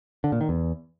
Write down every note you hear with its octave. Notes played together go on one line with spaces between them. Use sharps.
D3
A#2
D#3
E2